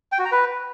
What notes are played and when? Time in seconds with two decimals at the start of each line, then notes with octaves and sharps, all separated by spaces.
0.12 G5
0.19 F#4
0.25 A#5
0.32 B4